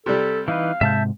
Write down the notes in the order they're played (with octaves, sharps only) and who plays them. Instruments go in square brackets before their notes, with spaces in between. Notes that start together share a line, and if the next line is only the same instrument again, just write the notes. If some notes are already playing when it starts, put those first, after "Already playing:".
[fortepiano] C3 G3 [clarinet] A4
[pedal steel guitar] E3 D#4 B4 [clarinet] F5
[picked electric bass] G#2 C3 G#3 [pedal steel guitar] E5 A5 G6